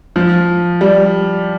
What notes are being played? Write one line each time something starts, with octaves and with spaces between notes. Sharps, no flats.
F3
G3